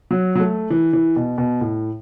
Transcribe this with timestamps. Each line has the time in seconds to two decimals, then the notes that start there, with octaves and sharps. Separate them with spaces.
0.11 F#3
0.35 F#3
0.40 A3
0.70 E3
0.93 E3
1.16 B2
1.38 B2
1.61 A2